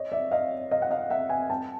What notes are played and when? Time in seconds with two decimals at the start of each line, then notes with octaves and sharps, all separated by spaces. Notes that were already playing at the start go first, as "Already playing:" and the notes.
Already playing: C#5 D#5
0.12 D5 E5
0.31 D#5 F5
0.71 D#5 F5
0.82 F#5
0.91 D#5 F5
1.10 E5 F#5
1.29 F#5 G#5
1.50 G5 A5